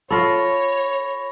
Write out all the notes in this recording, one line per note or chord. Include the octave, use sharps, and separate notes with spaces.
F4 A4 C#5 B5 C#6 A#6